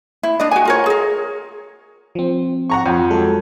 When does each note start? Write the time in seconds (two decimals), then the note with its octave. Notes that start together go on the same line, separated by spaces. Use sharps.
0.23 E4
0.40 D4 D#5
0.51 F#4 G#5
0.65 F4 A#4 C#5
0.86 G#4 A#4
2.15 F3 C4
2.70 F#5 A#5 C#6
2.86 F2
3.10 F#3 G#3 A4